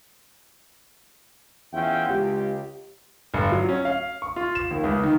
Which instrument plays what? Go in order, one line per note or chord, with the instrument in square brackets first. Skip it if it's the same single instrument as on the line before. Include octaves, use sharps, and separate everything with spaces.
[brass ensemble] E2 C#4 F4 E5 F#5 G5
C#2 G4
[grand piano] G1
F#3
C#4
F5
C#6
F4
E7
D#2
C#2
D#3